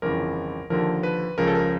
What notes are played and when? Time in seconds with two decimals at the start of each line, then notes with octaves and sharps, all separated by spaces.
0.02 G1 F2 C#3 E3 A#4
0.70 D#2 D3 F3 A#4
1.03 B4
1.38 C#2 C#3 F3 A#4
1.47 A4
1.55 A#4